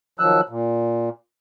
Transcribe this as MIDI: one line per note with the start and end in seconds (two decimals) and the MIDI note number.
0.19 0.41 51
0.19 0.41 53
0.19 0.41 54
0.19 0.41 88
0.19 0.41 90
0.49 1.09 46